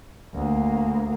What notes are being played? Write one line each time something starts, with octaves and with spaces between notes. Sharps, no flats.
D2 A#3